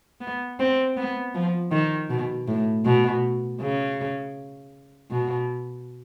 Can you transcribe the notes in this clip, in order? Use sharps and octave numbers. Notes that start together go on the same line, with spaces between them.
B3
C4
B3
F3
D#3
B2
A2
B2
C#3
B2